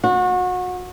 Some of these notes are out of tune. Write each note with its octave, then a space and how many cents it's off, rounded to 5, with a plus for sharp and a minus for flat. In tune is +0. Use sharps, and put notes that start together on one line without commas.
F#4 -30